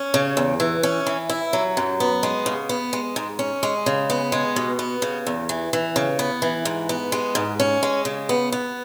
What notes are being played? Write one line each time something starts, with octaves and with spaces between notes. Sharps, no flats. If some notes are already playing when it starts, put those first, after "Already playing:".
Already playing: C#4
C#3
E2
E3
C#4
E3
E4
F#3
F#2
B3
G#3
C#3
B3
G#3
G#2
C#4
G#3
C#3
B3
G#3
B2
B3
C#3
E2
E3
E3
C#3
B3
E3
G#2
B3
G#3
G#2
C#4
G#3
C#3
B3
B3